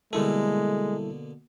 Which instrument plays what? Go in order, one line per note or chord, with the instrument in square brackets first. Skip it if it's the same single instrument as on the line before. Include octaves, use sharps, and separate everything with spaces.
[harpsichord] B2 D3 A#3 [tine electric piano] G3 E4 A4 [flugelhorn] G#3